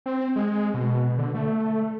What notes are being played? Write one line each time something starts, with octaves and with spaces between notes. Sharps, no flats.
C4
G#3
B2
D3
A3